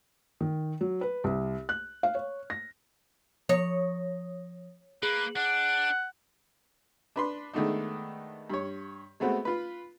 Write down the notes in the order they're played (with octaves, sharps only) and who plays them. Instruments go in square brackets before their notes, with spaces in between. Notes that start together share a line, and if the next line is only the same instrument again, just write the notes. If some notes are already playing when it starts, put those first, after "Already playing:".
[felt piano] D#3
F#3
B4
C2
F#6
F5
C#5
A#6
[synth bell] F3 D#6 A#6 [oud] C#5
[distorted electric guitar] A#3 [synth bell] G#4 F#7 [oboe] B4
[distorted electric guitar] D4 [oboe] F#5
[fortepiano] D4 B4 C6
D#3 G#3 A3 B3 D4 D#4
G2 C#5
G#3 A3 B3 C4 F#4
F4 B4